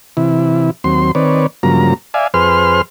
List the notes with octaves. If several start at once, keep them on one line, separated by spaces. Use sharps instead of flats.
C3 E3 E4
D#2 F#3 C4 C6
D#3 C4 B4 C#5 D5
G2 C#3 F3 F#3 A#3 A#5
D5 E5 F5 G#5
F2 G#4 B4 C5 C6 F6